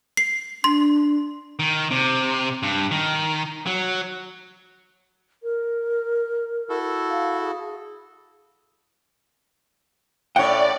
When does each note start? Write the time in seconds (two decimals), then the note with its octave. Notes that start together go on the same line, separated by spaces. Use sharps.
0.17 C7
0.64 D4 C6
1.59 D#3
1.91 C3
2.63 G2
2.91 D#3
3.66 F#3
5.43 A#4
6.69 E4 F#4 A4
7.10 F5
7.42 G#4
10.36 A2 C#4 C#5 D5 F#5 G5